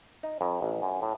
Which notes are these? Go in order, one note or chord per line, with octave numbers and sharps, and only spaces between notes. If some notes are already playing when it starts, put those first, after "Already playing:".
D#4
F2
A1
F#2
A2